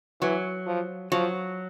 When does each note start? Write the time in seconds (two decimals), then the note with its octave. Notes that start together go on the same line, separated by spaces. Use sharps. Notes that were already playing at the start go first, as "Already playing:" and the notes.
0.21 E3 F#3
0.66 F3
1.12 F3 F#3